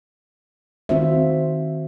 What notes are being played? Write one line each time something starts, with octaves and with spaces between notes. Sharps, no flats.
D#3 C4 F4 F#4 C5 E5